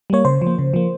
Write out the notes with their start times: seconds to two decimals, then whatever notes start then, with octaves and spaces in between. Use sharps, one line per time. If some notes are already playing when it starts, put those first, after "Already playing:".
0.10 G3 A#3 C#5
0.25 C#3 C5
0.42 F3
0.47 A#3
0.58 C#3
0.74 F3 A#3